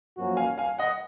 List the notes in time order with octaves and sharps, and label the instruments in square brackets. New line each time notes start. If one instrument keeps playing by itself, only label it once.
[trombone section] F#2 F3 A#3 C#4 F#4
[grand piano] F5 G#5
F5 G#5
D#5 F#5